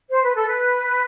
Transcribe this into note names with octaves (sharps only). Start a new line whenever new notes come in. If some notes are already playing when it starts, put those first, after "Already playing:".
C5
B4
A4
B4